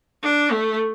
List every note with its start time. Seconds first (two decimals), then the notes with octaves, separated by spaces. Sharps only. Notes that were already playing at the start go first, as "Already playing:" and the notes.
0.23 D4
0.52 A3